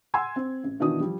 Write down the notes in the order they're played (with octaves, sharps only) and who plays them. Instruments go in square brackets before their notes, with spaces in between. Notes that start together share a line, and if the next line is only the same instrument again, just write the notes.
[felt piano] F#5 G#5 C6 E6 G#6
C4
A1
B2 D#3 E3 D4 F#4 D#6
F3 G3